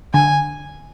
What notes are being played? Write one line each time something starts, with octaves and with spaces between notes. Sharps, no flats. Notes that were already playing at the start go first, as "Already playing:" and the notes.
D3 G#5